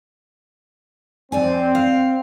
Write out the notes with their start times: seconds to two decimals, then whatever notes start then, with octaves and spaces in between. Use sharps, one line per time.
1.32 F2 C4 D5 G#5
1.75 F5